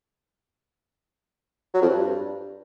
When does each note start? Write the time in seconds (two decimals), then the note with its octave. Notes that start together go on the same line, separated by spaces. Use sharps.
1.74 F#3
1.82 F2
1.90 G2